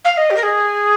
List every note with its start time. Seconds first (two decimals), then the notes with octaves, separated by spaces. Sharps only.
0.04 F5
0.17 D#5
0.30 G4
0.36 A#4
0.43 G#4